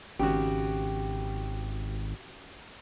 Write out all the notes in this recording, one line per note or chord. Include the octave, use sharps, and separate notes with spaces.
G#1 C#3 F#4 G4